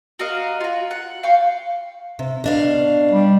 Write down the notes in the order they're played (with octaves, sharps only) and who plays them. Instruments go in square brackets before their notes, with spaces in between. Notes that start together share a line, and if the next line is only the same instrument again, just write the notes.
[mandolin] F#4 A#4 D#5 F5
F4 F#4
F#5
F5 G5 C#6
[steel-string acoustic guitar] C3
B2 D4 F5
[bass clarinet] G3